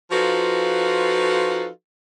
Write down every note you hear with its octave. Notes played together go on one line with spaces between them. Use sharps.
F3 D#4 F4 F#4 A4 B4